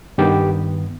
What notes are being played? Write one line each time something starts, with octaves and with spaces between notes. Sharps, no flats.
G2 D#3 B3 G4